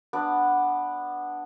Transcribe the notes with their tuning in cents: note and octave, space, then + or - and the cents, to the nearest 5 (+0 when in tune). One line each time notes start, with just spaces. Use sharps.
B3 +0 D4 +5